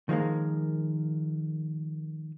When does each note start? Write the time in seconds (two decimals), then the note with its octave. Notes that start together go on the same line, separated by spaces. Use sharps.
0.09 D#3 F3 G#3 A#3